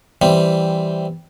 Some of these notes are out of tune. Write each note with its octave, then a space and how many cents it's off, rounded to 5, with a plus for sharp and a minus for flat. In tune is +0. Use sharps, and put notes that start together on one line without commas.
E3 +0 G3 -5 C4 +0